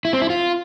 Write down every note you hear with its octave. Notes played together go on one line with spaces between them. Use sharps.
E4
C4
E4
F4